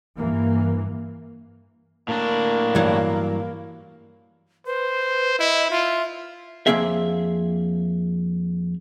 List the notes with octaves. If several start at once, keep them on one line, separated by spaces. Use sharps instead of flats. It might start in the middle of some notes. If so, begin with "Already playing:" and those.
G2 E3 A#3
A2 A#3 D4
G2 E3 F#3
B4 C5
E4 D#5
F4 E5
F2 A#3 C4 G#4 E5